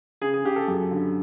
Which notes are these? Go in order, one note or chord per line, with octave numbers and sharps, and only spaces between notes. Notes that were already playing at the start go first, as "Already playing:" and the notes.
C#3 G#4
G#4
C#3 G4
A4
F#2
D3